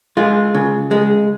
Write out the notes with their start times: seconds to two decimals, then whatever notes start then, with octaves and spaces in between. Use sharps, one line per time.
0.17 G#3 F4
0.54 C#3
0.91 G#3